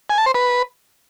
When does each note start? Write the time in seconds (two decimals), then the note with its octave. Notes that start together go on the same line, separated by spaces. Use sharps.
0.10 G#5
0.18 A5
0.26 C5
0.34 B4